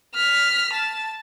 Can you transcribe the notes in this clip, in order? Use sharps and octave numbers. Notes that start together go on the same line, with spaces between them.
F6 B6
A5